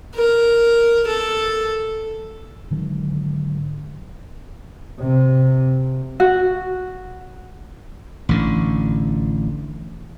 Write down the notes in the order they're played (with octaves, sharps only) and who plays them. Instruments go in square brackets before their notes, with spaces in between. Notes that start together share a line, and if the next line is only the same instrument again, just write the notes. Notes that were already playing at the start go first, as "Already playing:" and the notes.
[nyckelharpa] A#4
A4
[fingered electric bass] G#2 D3 D#3 F#3
[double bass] C3
[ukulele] F#4
[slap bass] A1 D3